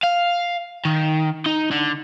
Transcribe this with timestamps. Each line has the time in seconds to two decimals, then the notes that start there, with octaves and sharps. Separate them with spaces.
0.03 F5
0.85 D#3
1.46 D#4
1.71 D3